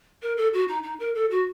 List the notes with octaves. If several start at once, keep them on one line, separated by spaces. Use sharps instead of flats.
A#4
A4
F#4
D#4
D#4
A#4
A4
F#4